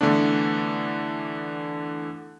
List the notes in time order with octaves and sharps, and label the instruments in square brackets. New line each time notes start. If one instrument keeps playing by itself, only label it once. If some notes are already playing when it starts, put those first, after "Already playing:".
[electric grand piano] D3 E3 A3 B3 D4